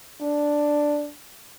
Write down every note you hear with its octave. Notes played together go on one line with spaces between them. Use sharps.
D4